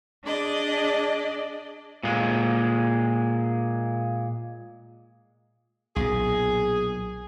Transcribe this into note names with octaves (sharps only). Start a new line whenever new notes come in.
D4 G#4 D5 D#5
A#2 G#3
B1 A#2 G#4